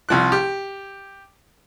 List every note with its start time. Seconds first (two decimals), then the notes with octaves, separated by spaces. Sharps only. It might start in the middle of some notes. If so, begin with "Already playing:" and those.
0.09 C2 F3 F#6
0.32 G4